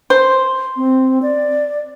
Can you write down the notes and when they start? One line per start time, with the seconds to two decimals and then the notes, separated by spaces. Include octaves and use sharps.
0.10 C5
0.77 C4
1.22 D5